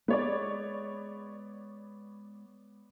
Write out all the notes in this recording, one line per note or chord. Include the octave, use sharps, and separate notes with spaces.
G#3 B3 C#5 D5